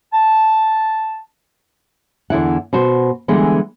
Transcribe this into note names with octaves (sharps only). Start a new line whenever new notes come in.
A5
E2 D3 E4 F#5
B2 F#4 C5
D3 E3 G3 G#3 B3